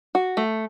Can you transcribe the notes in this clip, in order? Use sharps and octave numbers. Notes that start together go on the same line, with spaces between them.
F#4
A3